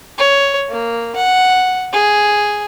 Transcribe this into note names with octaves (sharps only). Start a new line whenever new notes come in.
C#5
A#3
F#5
G#4